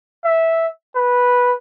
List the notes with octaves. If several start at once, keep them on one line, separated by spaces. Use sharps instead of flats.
E5
B4